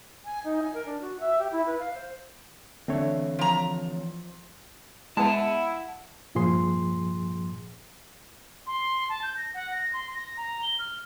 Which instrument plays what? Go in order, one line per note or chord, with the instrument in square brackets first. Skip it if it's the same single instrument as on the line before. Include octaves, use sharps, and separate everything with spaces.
[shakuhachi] G#5
D#4
G#5
A#4
D4
F#4
E5
G4
E4
B4
F5
C5
[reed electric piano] D3 A3 C#5 [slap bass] E3 C4
[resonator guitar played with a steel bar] F3 A#5
[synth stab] G#3 B3 [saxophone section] E4 [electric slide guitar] F#5 A5
[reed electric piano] G2 A#2 F3 G#4 C6
[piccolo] C6
A5
G6
A#6
F#5
A#6
C6
A#6
A#5
G7
F6